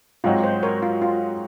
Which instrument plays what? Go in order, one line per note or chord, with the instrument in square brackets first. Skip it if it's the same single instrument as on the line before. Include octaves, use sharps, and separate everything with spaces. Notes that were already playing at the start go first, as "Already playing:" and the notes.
[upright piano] G#2 F#3 C4 D#4 F#4 [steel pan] F4
[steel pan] C5
A#4 C#5
F4
F4